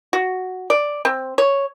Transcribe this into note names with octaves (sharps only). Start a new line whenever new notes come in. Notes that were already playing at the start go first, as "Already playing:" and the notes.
F#4
D5
C4
C#5